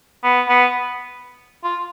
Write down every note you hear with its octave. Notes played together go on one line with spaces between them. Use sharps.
B3
B3
F4